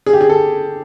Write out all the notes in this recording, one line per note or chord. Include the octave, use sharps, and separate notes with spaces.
G#4
G4
G#4
A4